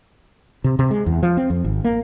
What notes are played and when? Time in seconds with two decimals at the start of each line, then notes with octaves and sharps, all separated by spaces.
0.64 C3
0.79 C3
0.91 G#3
1.06 E2
1.23 F3
1.37 C4
1.50 F2
1.64 G#1
1.84 A#3